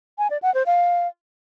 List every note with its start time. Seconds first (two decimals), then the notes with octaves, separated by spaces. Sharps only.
0.18 G#5
0.30 D5
0.42 F#5
0.54 C5
0.66 F5